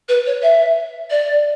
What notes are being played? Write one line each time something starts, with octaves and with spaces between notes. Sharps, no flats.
B4
C#5
E5
D5